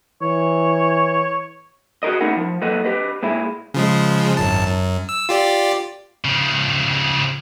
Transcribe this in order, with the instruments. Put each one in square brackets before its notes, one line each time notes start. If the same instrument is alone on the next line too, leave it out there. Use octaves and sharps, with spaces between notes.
[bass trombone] E3 [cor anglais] C#5
[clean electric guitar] F#4 G#4 A#4 D#5
A3 C#4 D#4 E4 A#4 F#5
F3
F#3 A#3 A4 B4 D#5 F#5
G4 B4 D#5
A#2 G#3 E4
[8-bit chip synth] C#3 F3 G#3
G#1 F#2 A5
F#2
E6
F4 G4 D5
[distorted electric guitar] C#3 F3